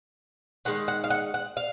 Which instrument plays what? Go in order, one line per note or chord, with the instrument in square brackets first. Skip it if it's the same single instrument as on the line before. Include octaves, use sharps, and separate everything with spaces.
[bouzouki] D#3 G#3 F#5
F#5
F5
F#5
F#5
F5